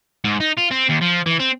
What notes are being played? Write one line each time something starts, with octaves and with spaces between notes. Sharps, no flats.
G#2
D#4
F4
C4
D#2
F3
E3
C4